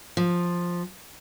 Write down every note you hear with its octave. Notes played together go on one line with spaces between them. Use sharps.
F3